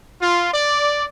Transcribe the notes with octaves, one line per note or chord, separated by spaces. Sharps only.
F4
D5